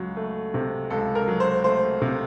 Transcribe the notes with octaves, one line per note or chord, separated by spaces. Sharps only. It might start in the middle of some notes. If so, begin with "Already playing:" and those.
Already playing: C#2 F#3
A3
C3
C#2 A4
A#4
F#3
C5
A3 C5
C3